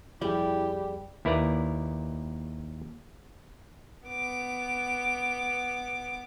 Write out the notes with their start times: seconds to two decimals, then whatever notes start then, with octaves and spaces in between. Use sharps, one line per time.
0.21 F2 G3 E4 G4 G#4 D5
1.25 D#2 E4 A#4 B4 D5 A#5
4.08 B3 D6